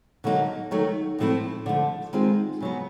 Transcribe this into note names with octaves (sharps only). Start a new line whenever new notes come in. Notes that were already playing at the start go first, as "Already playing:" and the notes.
D3 F#3 A#3 D#4
D#3 F#3 A3
A2 F3 A3 C4 E4
D3 F3 A3
D#3 G#3 C4 F4
C#3 F#3 B3